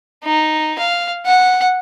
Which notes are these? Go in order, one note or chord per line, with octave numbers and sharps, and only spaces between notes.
D#4
F5
F#5